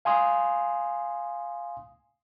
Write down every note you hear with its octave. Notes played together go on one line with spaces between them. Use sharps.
F5 G#5 C6 D#6